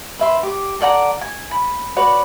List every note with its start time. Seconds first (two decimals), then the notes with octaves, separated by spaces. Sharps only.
0.19 B4 E5 C6
0.43 G4 D6
0.81 A4 D5 F#5 A#5
1.21 G#5
1.51 B5
1.96 F#4 B4 C#5 D5